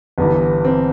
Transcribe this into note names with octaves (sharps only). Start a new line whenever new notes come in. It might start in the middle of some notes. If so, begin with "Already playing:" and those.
G1 G2 E3 B3
C4